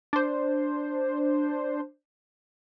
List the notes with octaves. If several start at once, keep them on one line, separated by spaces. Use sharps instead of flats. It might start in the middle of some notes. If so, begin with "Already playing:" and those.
D4 C5